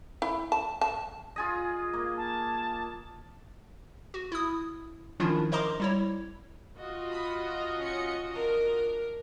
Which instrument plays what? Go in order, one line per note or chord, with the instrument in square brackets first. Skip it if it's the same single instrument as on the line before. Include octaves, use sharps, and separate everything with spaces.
[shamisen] E4
A5
A5
[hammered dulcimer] F4 G#4 D#5
A#3
[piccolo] A5
[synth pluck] F#4
E4 D#6
D#3 F3 C#4 D4 E4 F4
A#4 C5 D#5 A#5 C6 D6
G3 E4 C#5
[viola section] F4 F#4 D#5
[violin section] B5 D#6 B6
A#5
C#4 C#7
D4 A#4